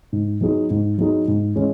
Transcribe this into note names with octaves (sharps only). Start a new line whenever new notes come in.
G#2
F#3 B3 D#4 G#4
G#2
F#3 B3 D#4 G#4
G#2
E3 G#3 C#4 E4